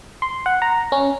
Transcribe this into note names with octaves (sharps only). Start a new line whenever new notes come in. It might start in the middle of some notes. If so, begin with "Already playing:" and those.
C6
F#5
A#5
C#4